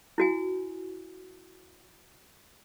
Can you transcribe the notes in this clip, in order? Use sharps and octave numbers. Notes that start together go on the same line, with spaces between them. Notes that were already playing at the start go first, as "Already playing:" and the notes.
E4 F#4 G#5